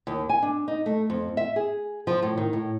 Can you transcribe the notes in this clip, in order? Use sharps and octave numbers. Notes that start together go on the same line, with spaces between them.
D#2
G#5
D4
D#4
A3
F2
E5
G#4
F3
A2
D#3
A2